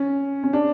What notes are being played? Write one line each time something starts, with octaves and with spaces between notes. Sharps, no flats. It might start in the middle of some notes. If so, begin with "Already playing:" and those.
Already playing: C#4
C#4
D4